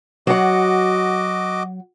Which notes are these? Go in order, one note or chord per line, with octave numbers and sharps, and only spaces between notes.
F#3 F#4 D#5 F#5 D6